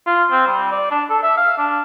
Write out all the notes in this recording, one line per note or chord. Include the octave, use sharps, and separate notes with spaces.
F4
C4
G3
D5
D4
A4
E5
F5
D4